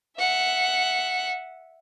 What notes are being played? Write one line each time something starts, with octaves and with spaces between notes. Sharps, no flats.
E5 F#5